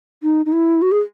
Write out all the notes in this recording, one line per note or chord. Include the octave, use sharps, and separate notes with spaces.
D#4
D#4
E4
F#4
G#4